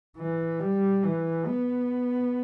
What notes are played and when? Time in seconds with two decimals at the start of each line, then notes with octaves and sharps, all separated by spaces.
0.17 E3
0.60 G3
1.03 E3
1.46 B3